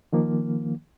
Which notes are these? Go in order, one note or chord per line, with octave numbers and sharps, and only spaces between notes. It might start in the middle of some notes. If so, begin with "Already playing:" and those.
D#3 F3 A#3